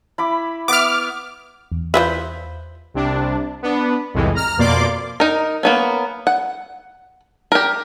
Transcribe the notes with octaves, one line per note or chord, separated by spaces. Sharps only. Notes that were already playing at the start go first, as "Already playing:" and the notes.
E4 B5 D6
B3 E5 D6 F6
E2
E3 F4 B4 C5 E5
C2 C3 D4
B3 D4
C2 F2 A2 E3 G#3
A#5 F6
F2 B2 A#3 D5 C6 D6
D#4 A#4
A#3 B3 C#4
F#5
G4 A#4